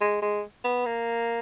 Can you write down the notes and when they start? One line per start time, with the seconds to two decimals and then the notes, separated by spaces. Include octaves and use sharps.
0.01 G#3
0.22 G#3
0.64 B3
0.86 A#3